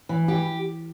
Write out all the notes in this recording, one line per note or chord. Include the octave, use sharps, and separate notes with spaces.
E3
G4